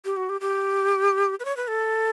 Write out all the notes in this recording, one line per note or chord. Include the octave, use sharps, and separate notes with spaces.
G4
F#4
G4
G4
B4
C#5
B4
A4